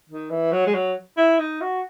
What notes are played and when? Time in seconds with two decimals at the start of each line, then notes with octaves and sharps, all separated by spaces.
0.09 D#3
0.30 E3
0.52 F#3
0.66 G#3
0.74 F#3
1.17 E4
1.39 D#4
1.61 F#4